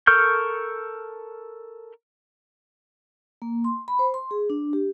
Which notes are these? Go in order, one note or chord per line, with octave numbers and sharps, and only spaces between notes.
A4 A#4 C#6 F6 G6
A#3
C6
B5
C5
C6
G#4
D4
G4